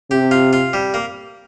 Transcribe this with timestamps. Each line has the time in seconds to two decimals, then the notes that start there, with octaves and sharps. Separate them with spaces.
0.11 C3 G4
0.31 F4
0.53 F4
0.73 G3
0.94 A#3